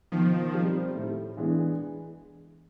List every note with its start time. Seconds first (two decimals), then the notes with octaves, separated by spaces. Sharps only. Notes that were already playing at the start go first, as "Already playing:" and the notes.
0.12 B2 D#3 F3
0.54 G3 C4
0.95 A2
1.37 E3 G#3 B3 D4